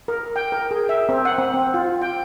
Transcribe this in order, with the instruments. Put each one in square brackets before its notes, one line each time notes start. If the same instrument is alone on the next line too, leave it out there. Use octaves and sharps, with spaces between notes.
[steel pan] A#4
G5
A#4
G#4
E5
C4
F#5
C4
C4
F4
G5